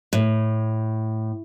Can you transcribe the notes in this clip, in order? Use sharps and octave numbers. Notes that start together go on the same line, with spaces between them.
A2